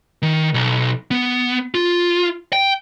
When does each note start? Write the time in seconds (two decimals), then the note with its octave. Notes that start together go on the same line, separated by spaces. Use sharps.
0.22 D#3
0.54 B1
1.11 B3
1.75 F4
2.53 G5